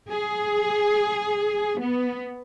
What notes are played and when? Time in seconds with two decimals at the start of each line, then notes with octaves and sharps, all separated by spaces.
0.11 G#4
1.80 B3